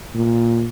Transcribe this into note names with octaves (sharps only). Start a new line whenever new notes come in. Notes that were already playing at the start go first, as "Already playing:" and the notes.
A#2